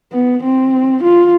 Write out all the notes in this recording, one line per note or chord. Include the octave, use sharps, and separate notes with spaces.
B3
C4
F4